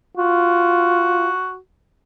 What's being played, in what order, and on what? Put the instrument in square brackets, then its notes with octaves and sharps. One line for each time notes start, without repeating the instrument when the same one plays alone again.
[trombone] F4 [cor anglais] F#4